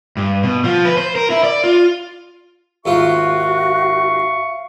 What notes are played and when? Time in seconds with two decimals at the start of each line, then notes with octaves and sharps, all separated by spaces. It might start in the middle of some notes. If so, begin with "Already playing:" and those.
0.17 G2
0.43 B2
0.64 F3
0.85 B4
0.97 C5
1.16 A#4
1.30 E4
1.44 D5
1.64 F4
2.86 D#2 G#2 F4 F#4 E5 F5 C#6